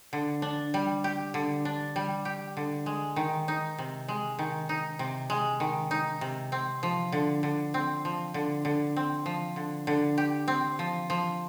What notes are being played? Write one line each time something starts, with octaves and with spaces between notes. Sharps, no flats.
D3
D4
G3
G4
D3
D4
G3
G4
D3
G#3
D#3
D#4
C3
G#3
D#3
D#4
C3
G#3
D#3
D#4
C3
C4
F3
D3
D3
C4
F3
D3
D3
C4
F3
D3
D3
G4
C4
F3
F3